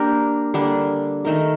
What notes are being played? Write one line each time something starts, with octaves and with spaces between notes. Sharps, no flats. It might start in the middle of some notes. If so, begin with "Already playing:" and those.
Already playing: A#3 D4 G4 A#4
D3 G3 A#3 D4
D#3 A3 D#4 A#4